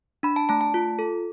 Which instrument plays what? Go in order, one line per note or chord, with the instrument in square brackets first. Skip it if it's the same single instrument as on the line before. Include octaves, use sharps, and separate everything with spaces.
[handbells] D4 B5
A5
A3 A5
A5
F4
A4